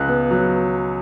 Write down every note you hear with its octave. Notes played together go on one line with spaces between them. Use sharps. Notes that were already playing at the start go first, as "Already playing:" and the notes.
Already playing: C#2 C#3 F#6
B3
F#3